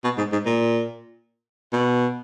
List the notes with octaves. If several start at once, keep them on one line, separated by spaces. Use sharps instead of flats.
B2
G#2
G#2
A#2
B2